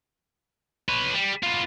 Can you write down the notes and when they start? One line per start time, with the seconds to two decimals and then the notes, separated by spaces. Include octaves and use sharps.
0.89 B4 C#5
1.14 G3
1.43 B3 F4